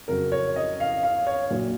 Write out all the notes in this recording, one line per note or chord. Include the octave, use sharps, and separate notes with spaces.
F2 C#3 F#3 A#4
C#5
D#5
F5
F5
C#5
A#1 A#2 F#3